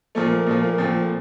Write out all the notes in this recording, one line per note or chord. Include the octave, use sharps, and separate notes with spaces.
A#2 F3 A3
A#3
A#2 F3 A3
A#3
A#2 F3 A3 C4